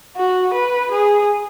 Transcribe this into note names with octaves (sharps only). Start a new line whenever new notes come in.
F#4
B4
G#4